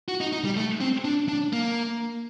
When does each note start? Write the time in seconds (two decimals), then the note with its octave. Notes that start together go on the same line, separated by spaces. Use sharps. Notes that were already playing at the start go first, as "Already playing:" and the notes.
0.08 F#4
0.21 D#4
0.33 D#4
0.45 G3
0.57 A3
0.81 C4
1.05 D4
1.29 D4
1.53 A#3